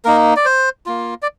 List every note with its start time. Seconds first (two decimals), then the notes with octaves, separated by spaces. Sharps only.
0.05 A#3 D#4 A#4
0.36 D5
0.45 C5
0.86 A#3 F4
1.22 D5